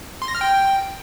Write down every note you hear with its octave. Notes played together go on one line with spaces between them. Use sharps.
C6
A#6
F6
G5